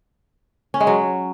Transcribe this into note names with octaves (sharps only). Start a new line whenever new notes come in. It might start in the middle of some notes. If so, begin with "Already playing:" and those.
C#4
G#3
F#3